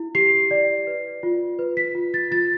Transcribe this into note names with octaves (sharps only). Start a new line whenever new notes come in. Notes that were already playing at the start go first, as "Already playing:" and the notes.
Already playing: E4
G4 C7
D5
B4
F4
B4
B6
F4
A6
F4 A6